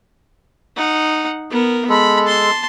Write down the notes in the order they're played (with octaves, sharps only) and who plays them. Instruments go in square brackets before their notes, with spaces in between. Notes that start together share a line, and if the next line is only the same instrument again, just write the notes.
[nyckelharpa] D#4 F#5
B3 A#4
[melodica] G#3 A4 [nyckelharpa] B5
[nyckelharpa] A5 C6